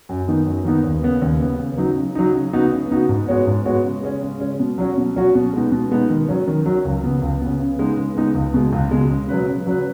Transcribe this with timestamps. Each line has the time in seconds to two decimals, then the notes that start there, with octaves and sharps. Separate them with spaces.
0.09 F#2
0.28 D#3 B3 D#4
0.46 F#2
0.65 D#3 B3 D#4
0.84 D#2
1.03 C#3 B3
1.22 D#2
1.41 C#3 B3
1.59 C#3
1.78 F#3 D#4
1.96 C#3
2.15 F#3 D#4
2.35 C#3
2.53 B3 D#4 F#4
2.72 C#3
2.91 B3 D#4 F#4
3.09 G#2
3.28 G#3 B3 F#4 C#5
3.47 G#2
3.65 G#3 B3 F#4 C#5
3.84 C#3
4.03 G#3 C#4
4.21 C#3
4.40 G#3 C#4
4.60 B2
4.78 F#3 C#4 F#4
4.97 B2
5.16 F#3 C#4 F#4
5.35 B2
5.53 G#3 B3 D#4
5.72 B2
5.91 G#3 B3 D#4
6.09 D#3
6.28 F#3 C#4
6.47 D#3
6.66 F#3 C#4
6.85 C#2
7.04 C#3 B3
7.22 C#2
7.42 C#3 B3
7.60 C#3
7.79 G#3 B3 D#4
7.97 C#3
8.17 G#3 B3 D#4
8.35 C#2
8.54 B2 G#3
8.73 C#2
8.91 B2 G#3
9.11 C#3
9.29 F#3 C#4 B4
9.48 C#3
9.66 F#3 C#4 B4